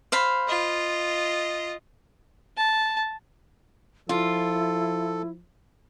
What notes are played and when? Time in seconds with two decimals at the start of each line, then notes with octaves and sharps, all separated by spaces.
0.12 C5 F5 B5
0.48 F4 D#5
2.57 A5
4.09 F3 E4 F4 A4